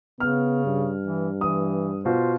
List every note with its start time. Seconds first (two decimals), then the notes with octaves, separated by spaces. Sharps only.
0.20 C#3 B3 F6
0.65 G2
1.03 E3
1.41 E3 D#6
2.05 B2 F4 F#4 C5